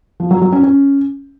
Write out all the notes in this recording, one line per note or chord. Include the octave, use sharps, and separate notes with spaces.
F3
F#3
F#3
C#4
C#4